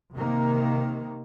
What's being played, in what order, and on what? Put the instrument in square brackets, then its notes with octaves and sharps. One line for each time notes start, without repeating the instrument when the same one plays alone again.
[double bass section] C3 D#3 A#3